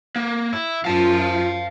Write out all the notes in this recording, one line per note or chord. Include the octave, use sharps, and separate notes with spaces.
A#3
E4
F#2 F4 F5 A5